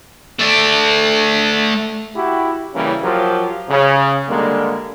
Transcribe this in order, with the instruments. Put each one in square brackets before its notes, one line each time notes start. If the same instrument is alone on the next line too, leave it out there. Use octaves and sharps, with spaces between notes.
[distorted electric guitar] A3 D5
[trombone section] E4 F#4 G4
C#3 E3 G3 A#3 C#4
F3 F#3 F4 G4 A#4
C#3
D3 G3 G#3 A#3